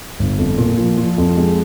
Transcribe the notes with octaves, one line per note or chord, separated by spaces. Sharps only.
G1
F2
A#2
F3
F3
F2
G#3